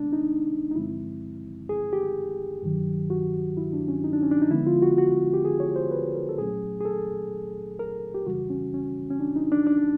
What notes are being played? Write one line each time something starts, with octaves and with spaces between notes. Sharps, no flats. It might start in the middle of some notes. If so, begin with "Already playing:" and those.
Already playing: C3 D#3 G#3 B3 D4
D#4
D#4
G2 D3 F3 G#3 C4 E4
G#4
G4
G2 D#3 F#3
F#4
E4
D4
C#4
D#4
D4
C#4
D4
D#4
D3 F3 G#3 B3 E4
F4
F#4
F#4
G4
G#4
C#5
C5
B4
A#4
A4
A#2 F#3 A3 C#4 G#4
G#4
A4
A#4
G4
F2 C#3 E3 G3 F#4
C#4
C#4
C#4
D4
D#4
D4
D4